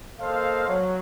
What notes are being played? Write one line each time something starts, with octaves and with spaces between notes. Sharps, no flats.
A#3 A4 C5 D#5 F5
F#3